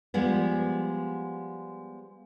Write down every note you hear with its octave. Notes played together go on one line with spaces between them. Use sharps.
F3 G3 G#3 B3